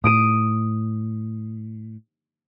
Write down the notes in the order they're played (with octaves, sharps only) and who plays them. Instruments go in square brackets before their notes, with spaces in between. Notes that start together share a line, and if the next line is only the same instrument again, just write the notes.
[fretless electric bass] A2 [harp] D#6 D7 D#7